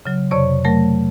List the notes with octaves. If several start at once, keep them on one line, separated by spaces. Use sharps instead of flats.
C#3 F#3
F2 C3 C#5 D5 C#6
F#3 A3 A#4 A#6